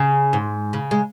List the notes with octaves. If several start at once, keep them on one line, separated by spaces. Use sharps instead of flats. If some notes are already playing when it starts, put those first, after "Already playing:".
Already playing: C#3
G#2
C#3
G#3